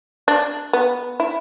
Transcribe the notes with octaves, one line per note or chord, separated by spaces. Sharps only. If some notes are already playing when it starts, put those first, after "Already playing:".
D4
B3
E4